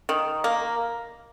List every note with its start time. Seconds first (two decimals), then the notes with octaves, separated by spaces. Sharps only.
0.09 D#3
0.44 A#3